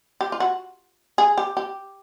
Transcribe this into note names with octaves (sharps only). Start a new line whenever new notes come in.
G4
F4
F#4
G#4
G4
G4